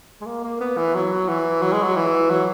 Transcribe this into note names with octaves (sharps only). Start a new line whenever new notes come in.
G#3
A#3
A#3
B3
E3
F#3
E3
F#3
G#3
F#3
E3
F#3